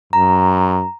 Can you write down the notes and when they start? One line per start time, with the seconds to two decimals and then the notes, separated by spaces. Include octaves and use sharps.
0.13 F#2 A#5